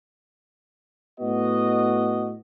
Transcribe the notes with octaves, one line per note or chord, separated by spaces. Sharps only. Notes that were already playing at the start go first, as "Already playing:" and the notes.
A2 B3 F#4 D#5